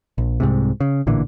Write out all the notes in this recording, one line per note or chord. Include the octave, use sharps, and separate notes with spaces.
A#1
C2 G#2 C3
C#3
A1 A#2 D3 E3